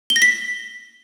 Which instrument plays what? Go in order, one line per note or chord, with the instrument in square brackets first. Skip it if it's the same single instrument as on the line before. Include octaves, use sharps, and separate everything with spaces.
[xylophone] G7
A#6
B6